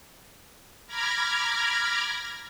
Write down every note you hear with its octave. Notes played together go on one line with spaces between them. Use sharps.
A#5 B5 D6 F6 G#6 A#6